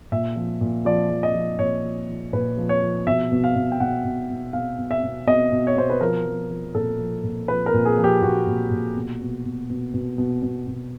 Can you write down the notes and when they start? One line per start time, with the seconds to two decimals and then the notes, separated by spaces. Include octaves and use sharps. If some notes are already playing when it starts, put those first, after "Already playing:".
0.12 A#2 E5
0.36 F3
0.61 A#2
0.85 F3 D5
1.10 F3
1.23 D#5
1.35 F3
1.59 A#2 C#5
1.84 F3
2.09 F3
2.33 A#2 B4
2.57 F3
2.69 C#5
2.82 F3
3.07 B2 E5
3.32 B2
3.44 F5
3.56 B2
3.72 G5
3.80 B2 F#5
4.04 B2
4.30 B2
4.53 B2 F5
4.78 B2
4.91 E5
5.03 B2
5.27 B2 D#5
5.52 B2
5.67 C#5
5.76 B2 C5
5.90 B4
6.01 F3 A#4
6.26 F3
6.51 F3
6.75 A#2 A4
6.99 F3
7.24 A#2
7.48 F3 B4
7.66 A#4
7.73 A#2
7.85 G#4
7.97 F3
8.04 G4
8.22 A#2 F#4
8.47 A#2
8.71 A#2
8.96 B2
9.21 B2
9.45 B2
9.70 B2
9.94 B2
10.18 B2
10.42 B2
10.67 B2